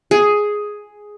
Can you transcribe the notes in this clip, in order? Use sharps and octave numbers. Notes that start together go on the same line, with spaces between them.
G#4